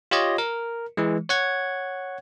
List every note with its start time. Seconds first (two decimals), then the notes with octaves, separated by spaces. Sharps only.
0.11 F4 G4 C#5 D#5
0.38 A#4
0.97 E3 G#3
1.29 C#5 F#5 G#6